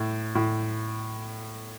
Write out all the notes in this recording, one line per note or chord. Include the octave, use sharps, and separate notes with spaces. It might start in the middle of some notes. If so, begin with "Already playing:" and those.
Already playing: A2
A2